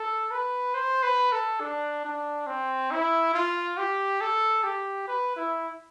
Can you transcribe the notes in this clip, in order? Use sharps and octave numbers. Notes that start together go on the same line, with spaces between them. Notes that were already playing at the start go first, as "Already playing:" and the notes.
Already playing: A4
B4
C5
B4
A4
D4
D4
C4
E4
F4
G4
A4
G4
B4
E4